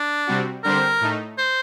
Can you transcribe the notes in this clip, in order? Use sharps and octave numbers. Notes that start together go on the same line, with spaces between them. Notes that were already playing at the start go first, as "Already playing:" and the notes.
Already playing: D4
C3 G3 C4 F#4
D3 G3 C4 G4 A#4 C5
A2 A3 D#4
C5